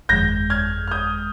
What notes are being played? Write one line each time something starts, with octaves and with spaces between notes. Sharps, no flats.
G1 F2 D#3 G#3 G6 A#6
F6 G#6
F6
D#6 G6